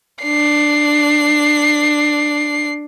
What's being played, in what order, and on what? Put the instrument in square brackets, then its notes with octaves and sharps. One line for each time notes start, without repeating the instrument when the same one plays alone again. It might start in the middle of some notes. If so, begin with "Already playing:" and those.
[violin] D4 C7